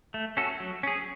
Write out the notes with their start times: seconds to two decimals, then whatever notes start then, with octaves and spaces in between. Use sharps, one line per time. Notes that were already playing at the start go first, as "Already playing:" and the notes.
0.14 A3
0.37 C#4 F#4 A4
0.60 F#3
0.83 C#4 G#4